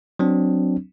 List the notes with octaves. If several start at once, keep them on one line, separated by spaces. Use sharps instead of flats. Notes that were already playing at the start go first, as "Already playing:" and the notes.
F#3 C4 D4